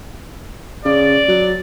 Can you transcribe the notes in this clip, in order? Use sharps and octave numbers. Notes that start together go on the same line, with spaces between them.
C#3 D5
F#3